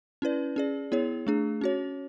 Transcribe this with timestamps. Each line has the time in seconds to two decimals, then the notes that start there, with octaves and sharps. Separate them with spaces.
0.22 C#4 E4 B4 D5
0.56 C#4 G#4 D5
0.92 B3 E4 G#4 C#5
1.27 A3 D4 G#4
1.61 C#4 F#4 C#5